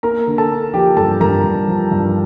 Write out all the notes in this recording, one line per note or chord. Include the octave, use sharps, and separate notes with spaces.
A#3 A#4 A#5
D3
A4 A5
A#3
F3 G4 G5
G2 A4 A5
G2 A#4 A#5
G2
F3
G2